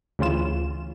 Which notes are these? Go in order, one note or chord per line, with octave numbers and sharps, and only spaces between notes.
D2 C#3 E3 F4 E7